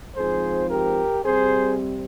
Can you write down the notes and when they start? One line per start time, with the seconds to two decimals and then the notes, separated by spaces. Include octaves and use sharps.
0.16 G#2 F3 C4 G#4 C5
0.70 G4 A#4
1.25 C3 G3 C4 G#4 C5